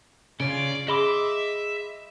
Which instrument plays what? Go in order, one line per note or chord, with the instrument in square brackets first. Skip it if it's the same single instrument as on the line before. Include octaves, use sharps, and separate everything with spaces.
[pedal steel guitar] C#3 C#4 F4 [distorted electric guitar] D5
[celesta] G#4 B5 [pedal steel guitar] D#5 C6 D6 [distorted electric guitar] E5